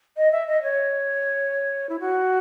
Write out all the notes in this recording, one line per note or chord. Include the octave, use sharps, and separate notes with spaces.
D#5
E5
D#5
C#5
E4
F#4